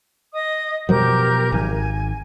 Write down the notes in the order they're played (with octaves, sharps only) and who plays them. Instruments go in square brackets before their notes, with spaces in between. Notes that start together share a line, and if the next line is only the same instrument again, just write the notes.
[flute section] D#5 D#6
[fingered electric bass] B2 F3 F#3 [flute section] G4 A#4 G6
[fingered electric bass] G#1 [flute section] G#5